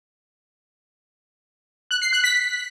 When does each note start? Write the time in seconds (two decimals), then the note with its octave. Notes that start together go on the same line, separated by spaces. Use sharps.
1.91 F#6
2.02 C7
2.13 F#6
2.24 B6